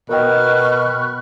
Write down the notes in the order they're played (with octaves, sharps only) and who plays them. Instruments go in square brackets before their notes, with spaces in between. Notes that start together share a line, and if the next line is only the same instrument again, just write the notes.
[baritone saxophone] B2 [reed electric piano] A#4 D#5 G5 [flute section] B5 C#6 F6 [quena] F#6